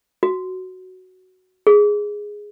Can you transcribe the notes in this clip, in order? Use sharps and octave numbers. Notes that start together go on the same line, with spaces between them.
F#4
G#4